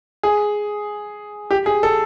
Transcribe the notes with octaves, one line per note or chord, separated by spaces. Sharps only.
G#4
G4
G#4
A4